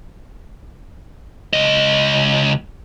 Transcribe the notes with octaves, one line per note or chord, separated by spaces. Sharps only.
C#2 D#5